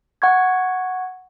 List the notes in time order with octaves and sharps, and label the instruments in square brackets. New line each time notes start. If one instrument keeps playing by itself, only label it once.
[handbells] F#5 C#6 G#6